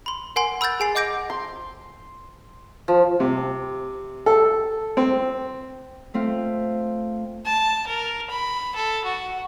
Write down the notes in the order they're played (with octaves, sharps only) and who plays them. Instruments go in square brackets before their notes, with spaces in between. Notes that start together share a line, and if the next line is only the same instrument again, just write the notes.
[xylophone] B5 C6
A#4 F#5 G#5 C6
B5 E6 F#6 G6 A6
G#4 G#5 C7
D#5 F#5 D6 G6 A#6 D7
[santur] C6
F3
[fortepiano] C3
A4
C4
[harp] A3 C4 F4
[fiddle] A5
A#4
B5
A4
F#4